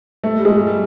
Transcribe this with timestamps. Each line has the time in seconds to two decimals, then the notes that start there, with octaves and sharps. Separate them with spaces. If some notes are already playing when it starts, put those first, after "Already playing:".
0.24 A3
0.39 G3
0.45 G#3
0.67 G3